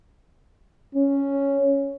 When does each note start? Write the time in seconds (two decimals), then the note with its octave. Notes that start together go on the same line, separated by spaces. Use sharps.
0.95 C#4